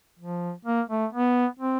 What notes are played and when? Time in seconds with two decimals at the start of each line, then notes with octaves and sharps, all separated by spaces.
0.19 F3
0.65 A#3
0.90 A3
1.14 B3
1.59 C4